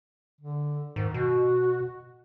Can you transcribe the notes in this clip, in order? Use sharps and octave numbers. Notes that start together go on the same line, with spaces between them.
D3
G#2 D#3
B2 F#4